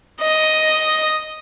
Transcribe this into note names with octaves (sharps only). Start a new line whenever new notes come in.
D#5